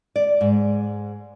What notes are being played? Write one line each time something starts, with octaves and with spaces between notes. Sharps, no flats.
D5
G#2